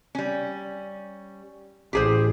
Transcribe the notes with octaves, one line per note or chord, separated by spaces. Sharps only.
G3 C#4
A1 G4 G#4 C5